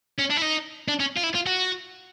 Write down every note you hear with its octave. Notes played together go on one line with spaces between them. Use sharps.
C#4
D4
E4
D#4
D4
C#4
F4
E4
F4
F#4